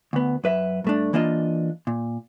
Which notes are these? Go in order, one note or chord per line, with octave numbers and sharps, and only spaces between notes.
D2 B3
F#2 B4 E5
G2 A3 D4
E3 A#3 D4 F4 D#5
A#2